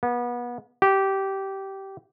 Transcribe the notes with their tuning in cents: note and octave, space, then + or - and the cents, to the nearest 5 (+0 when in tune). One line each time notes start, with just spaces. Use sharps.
B3 -30
G4 -15